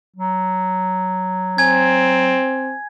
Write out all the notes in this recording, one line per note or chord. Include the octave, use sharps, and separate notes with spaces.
F#3
C4 G#5 G#6